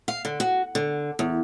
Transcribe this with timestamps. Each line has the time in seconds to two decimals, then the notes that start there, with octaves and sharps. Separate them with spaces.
0.08 F5
0.25 D3
0.40 F#4
0.75 D3
1.19 E2